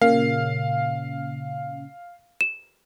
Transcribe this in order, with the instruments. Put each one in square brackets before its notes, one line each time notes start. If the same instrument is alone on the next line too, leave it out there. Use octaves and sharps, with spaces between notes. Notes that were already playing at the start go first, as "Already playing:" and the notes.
[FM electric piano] A#2 C#3 C#4 [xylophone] A#4 [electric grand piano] F5
[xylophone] E7